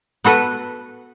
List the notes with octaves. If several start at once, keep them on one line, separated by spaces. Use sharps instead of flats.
B3 F#4 A4 B4